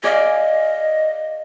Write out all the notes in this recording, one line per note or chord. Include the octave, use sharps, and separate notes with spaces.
G#4 D5 D#5 F5